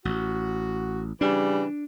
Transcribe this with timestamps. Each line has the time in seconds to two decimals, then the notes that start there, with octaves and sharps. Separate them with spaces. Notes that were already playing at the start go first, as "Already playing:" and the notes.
0.05 A1 F#4
1.21 C#3 E3 G3 D4